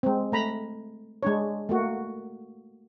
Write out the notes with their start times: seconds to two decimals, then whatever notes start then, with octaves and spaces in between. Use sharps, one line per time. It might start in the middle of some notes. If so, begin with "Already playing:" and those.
0.03 G#3 C4
0.32 A3 A#5 B5
1.23 G#3 D4 C#5
1.69 A3 A#3 F#4